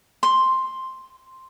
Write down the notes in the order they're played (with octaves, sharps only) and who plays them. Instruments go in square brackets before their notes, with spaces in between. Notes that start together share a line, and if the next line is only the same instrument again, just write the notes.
[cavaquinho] C6